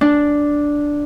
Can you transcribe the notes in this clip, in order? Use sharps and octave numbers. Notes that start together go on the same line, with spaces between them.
D4